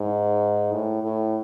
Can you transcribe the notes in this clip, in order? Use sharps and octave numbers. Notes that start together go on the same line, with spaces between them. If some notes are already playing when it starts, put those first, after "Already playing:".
Already playing: G#2
A2
A2